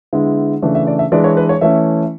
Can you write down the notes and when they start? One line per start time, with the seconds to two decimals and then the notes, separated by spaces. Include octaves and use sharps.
0.13 D3 G#3 B3 E4
0.63 C#3 E3 A3 D4
0.75 E5
0.87 D5
0.99 E5
1.12 E3 G#3 D4 D5
1.24 C#5
1.37 B4
1.49 C#5
1.61 E3 A3 C#4 E4 E5